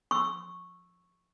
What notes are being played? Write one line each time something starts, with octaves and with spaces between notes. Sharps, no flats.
C#6 E6